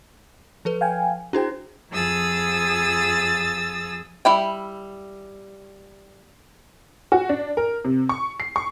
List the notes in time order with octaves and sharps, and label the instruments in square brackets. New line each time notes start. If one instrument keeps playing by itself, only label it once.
[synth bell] F3 A4 B4
[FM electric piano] F5 G5 G#5
[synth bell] D4 E4 C5 [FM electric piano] F#4 G#4 G5
[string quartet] F2 F3 G#4 D#6 E6 A6
[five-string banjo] G3 E4 G5
[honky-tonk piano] F#4
D4
A#4
C3
C#6
C7
C#6